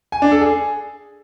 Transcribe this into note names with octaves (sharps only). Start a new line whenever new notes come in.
G#5
D4
A4
G#4